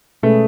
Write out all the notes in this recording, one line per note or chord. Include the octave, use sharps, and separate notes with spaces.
B2 G#3 A3 C#4 G#4 B4